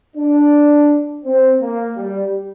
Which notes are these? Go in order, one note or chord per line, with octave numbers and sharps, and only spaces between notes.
D4
C4
A#3
G3